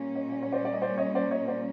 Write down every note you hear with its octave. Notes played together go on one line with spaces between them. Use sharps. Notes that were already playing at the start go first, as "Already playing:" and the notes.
Already playing: A#2 G3 A#3 C#4
C#5 D#5
D5
C#5
C5 D5
D5
D#5
C5 D5
C#5 D#5
C5 D5
C#5 D#5
C5 D5